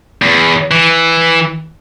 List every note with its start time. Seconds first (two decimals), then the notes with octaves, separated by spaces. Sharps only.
0.22 E2
0.71 E3